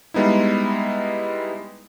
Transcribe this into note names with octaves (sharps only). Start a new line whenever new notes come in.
G3 G#3 B3 D#4 E4